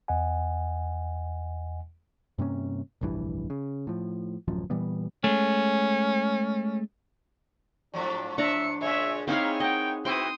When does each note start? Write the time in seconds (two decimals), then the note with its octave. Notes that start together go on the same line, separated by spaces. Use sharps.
0.08 E2 D#5 F#5 G#5
2.38 G2 C3 A#3 C#4
3.01 F1 A#1 G2 E3
3.50 C#3
3.87 A2 F3
4.48 D1 A1 F#2 F3
4.70 A#2 E3 G3 B3
5.24 G#3 A3 C#4
7.94 G#2 F3 F#3 D4
8.38 D4 E5 A#5 B5 C#7
8.81 A#2 C#3 G#3 C#5 E5
9.28 G#3 A#3 C4 D#4 E4 G#4 C#5 F5
9.60 D#5 F#5 G5
10.05 B3 C4 E4 F#4 G5 C6 D#6